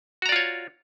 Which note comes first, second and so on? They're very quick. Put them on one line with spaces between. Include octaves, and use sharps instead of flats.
F#4 A#5 D5 F4 C#5